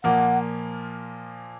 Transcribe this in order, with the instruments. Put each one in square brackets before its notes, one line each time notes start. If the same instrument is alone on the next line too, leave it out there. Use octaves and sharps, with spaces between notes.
[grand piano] A#2 F3 A#3 [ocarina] F#5